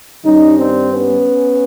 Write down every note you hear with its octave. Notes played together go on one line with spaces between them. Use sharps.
G2 D#3 G3 C#4 D#4
C4 D4
B3 C#4